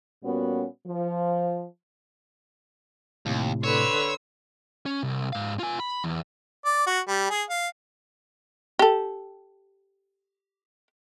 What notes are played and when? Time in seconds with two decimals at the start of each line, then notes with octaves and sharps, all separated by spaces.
0.23 A#2 G3 B3 C#4 F#4
0.86 F3
3.26 D#2 A2 C3
3.64 D3 B4 C#5 C6 E6
4.86 C#4
5.03 C2
5.33 G#2 F5
5.59 F4 G#5
5.80 B5
6.04 E2
6.65 D5
6.87 F#4
7.08 G3
7.31 G#4
7.50 F5
8.79 G4 A4